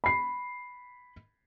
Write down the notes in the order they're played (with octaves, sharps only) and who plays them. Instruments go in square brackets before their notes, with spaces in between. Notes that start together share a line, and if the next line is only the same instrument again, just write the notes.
[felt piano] B5 C7